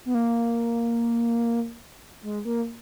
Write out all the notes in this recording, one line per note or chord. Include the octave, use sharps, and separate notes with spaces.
B3
A#3
G#3
A#3